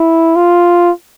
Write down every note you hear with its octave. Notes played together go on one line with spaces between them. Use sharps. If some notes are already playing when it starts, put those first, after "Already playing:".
Already playing: E4
F4